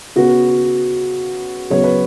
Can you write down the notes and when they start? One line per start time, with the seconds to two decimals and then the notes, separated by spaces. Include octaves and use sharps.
0.16 C#3 B3 F#4
1.70 C#3 F#3 B3 C#5
1.83 B4